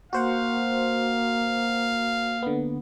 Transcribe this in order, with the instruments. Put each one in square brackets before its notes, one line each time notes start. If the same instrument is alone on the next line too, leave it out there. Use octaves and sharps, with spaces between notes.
[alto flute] A#3 [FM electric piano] F#4 C5 F#5 [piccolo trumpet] F5
[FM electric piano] D3 B3